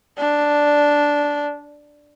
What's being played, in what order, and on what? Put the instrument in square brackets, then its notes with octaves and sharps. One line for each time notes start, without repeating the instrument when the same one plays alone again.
[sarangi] D4